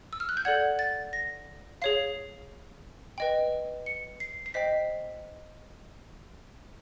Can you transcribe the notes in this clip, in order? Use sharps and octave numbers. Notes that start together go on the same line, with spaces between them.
E6
F6
F#6
G6
A4 D5 F#5 G#6
A6
A#6
G#4 C#5 F5 C7
B4 D#5 G5
C#7
C7
C7
C5 D#5 G5 B6